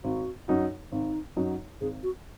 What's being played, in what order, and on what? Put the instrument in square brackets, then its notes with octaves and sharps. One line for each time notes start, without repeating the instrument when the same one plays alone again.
[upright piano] G#1 [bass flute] F#4
[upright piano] F#2 F#3 D#4 F#4
[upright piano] G#1 [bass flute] D#4
[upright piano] F#2 F#3 D#4 F#4
[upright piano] G#1 [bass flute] G#4
[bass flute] F#4